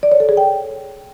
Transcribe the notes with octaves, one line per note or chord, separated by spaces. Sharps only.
D5
C#5
A4
G#4
G5